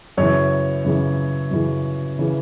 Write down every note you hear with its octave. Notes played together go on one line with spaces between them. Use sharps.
F#2 C#3 E3 C#5
F#2 C#3 E3
F#2 C#3 E3
C#3 E3